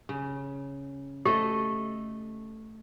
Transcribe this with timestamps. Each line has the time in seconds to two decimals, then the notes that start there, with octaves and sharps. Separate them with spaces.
0.09 C#3
1.26 A3 G4 A4 D#5